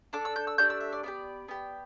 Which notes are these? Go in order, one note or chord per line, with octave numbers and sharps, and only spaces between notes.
D4 A4 D6
E6
G6
E6
A3 D4 G4 G6
E6
E5
D5
B3 D4 G4 D5
B3 G4